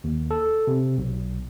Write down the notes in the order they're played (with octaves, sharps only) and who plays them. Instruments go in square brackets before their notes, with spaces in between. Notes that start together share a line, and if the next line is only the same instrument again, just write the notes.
[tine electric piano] D#2
A4
C3
B1